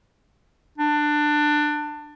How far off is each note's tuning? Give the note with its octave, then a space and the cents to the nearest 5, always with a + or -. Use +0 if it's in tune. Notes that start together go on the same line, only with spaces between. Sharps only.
D4 +20